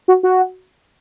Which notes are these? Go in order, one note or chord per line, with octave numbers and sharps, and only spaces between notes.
F#4
F#4